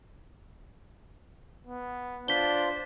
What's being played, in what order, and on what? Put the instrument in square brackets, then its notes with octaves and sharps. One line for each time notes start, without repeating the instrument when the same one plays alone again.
[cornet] B3
[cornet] D4 [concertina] F4 C5 [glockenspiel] B6 G7